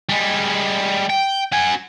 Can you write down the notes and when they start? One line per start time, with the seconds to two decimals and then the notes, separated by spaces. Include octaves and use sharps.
0.09 G3 G#3
1.10 G5
1.52 F#4 G#5